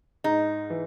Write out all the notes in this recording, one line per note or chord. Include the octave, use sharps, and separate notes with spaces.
G#2 D#4
E3